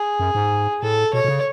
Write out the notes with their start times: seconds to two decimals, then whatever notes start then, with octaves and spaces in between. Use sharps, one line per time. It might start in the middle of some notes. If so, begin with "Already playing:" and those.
Already playing: G#4
0.20 F#2
0.35 G#2
0.82 A2 A4
1.13 B2 C#5
1.24 B2
1.28 C#3